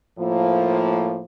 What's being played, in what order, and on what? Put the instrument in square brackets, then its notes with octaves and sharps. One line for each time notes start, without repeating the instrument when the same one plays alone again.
[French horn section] A2 F3 A#3